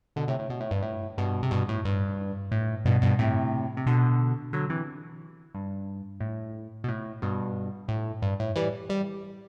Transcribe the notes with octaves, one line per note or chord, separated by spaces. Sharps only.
B2 D3
A2 C3
A2
B2
A2
G2
A2
G2 B2
C3
G2 B2
A2
G2
A2
G2 B2
G2 B2
A2 C3
C3
B2 D3
D3 F#3
C3 E3
G2
A2
B2
A2
G2 B2
A2
G2
A2
E3 G3
G3